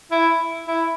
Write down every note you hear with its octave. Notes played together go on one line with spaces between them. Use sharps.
E4
E4